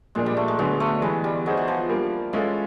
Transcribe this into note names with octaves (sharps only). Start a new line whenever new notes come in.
A#2 F3 G#3 A#3 D4
G3
A3
G#3
D3 F#3 G#3 B3 D4
A3
E3 G3 G#3 B3
G3
F#3 B3 D#4 G#4 C5
E3
F3
G3 A#3 D4
E3 G#3 C#4 F4 A4